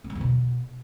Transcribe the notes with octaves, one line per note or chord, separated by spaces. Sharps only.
D3
G3
E2
B2